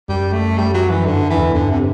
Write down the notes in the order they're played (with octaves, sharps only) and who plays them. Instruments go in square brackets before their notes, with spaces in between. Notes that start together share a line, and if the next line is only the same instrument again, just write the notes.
[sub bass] F#2 [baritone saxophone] G3
[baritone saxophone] A3
G3
F#3
E3
[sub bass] G2 [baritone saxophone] D3
[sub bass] F#2
[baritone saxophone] E3
[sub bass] E2
[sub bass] G2 [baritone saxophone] D3
[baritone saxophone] C3